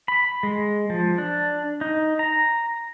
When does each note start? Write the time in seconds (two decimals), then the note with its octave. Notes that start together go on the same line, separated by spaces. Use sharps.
0.08 B5
0.43 G#3
0.90 F3
1.18 D4
1.81 D#4
2.19 A#5